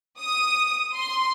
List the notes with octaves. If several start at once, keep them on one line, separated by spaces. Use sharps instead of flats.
D#6
C6